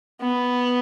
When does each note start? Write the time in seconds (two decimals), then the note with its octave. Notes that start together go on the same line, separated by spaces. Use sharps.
0.21 B3